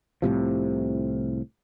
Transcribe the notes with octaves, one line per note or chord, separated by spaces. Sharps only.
C2 A2 C3 F3